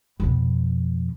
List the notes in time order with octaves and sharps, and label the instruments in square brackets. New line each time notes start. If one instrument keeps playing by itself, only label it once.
[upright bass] F2 B2